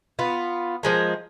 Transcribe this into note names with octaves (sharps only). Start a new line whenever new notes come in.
B3 F4
F3 G#3 A#4